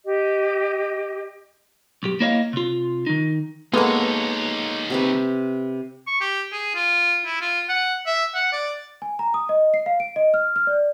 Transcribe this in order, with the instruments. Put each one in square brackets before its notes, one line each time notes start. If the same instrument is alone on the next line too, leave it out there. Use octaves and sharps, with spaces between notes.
[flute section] G4 D#5
[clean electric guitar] B1 G2 G4
A#3 E4 C#5 D#5 F5
C3 F4
D#3 D#4
[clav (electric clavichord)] G#3 A#3 [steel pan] B3 [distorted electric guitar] D#4 C#5 [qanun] A4 D#5
[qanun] C3 C4 B4
[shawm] C#6
G4
G#4
F4
E4
F4
F#5
E5
F#5
D5
[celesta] G#5
A#5
D#6
D#5
C7
F5
D7
D#5
F6
F6
D5